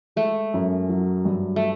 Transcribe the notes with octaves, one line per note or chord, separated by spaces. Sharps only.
G#3 A3
F#2
F#3
G2
A3